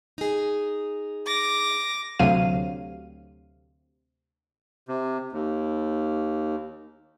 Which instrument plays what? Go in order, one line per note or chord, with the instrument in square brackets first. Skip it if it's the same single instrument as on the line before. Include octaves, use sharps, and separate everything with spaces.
[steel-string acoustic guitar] D#4 G#4
[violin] D6 A#6
[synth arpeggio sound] D2 C3 F#3 F5 D#7
[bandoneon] C3
D#2